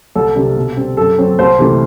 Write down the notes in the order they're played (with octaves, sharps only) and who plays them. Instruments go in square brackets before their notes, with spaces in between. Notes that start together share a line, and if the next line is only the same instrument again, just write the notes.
[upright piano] C2 A4
C3 G3 D4
B2
G3 C4
F#2 A4
F#3 C4
C2 C5
C3 E3 A3 C4